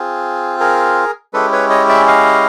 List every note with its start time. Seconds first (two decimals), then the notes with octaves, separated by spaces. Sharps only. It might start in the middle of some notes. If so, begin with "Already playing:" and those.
Already playing: C4 F4 G#4
0.60 G#4 A#4
1.33 G#3 C#4 E4 G4 A4 B4
1.52 B4 C#5
1.70 C#5 D#5
1.89 D5 E5
2.07 D#5 F5